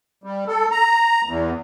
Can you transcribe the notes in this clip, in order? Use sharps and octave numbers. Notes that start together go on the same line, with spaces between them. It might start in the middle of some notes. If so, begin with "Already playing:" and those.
G3
A4
A#5
E2